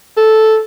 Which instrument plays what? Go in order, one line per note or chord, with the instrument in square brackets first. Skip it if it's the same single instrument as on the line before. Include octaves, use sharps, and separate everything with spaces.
[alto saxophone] A4